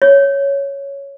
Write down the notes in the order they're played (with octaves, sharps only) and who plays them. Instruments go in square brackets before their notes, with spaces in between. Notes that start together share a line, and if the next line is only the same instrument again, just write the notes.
[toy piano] C#5